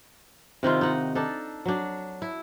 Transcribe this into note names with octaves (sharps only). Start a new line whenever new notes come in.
C3 D#3 E4 F4
D#4 F#5
D4 D#4 A4
F#3 D4
E4